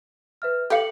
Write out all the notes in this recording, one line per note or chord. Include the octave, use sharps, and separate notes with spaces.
B4 E5 F6
G4 A4 F5 C#7 F#7